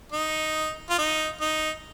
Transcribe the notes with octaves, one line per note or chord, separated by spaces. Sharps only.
D#4
F4
D#4
D#4